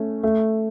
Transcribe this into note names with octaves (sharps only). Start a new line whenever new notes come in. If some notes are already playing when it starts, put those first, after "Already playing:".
Already playing: A3 C#4
A3